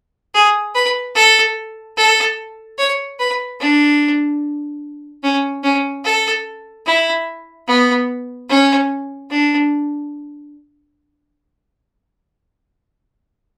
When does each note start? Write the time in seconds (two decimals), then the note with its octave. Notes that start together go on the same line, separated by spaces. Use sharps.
0.34 G#4
0.75 B4
1.15 A4
1.97 A4
2.78 C#5
3.19 B4
3.60 D4
5.23 C#4
5.63 C#4
6.04 A4
6.86 E4
7.67 B3
8.49 C#4
9.30 D4